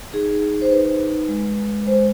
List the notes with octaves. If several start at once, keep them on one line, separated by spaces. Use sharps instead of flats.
D#4 G#4
D#4
D#4
C5
D#4 B4
D#4
D#4
G#3
G#3
G#3
G#3 C5